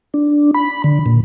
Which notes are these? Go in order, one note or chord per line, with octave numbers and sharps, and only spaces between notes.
D4
B5
D3
A#2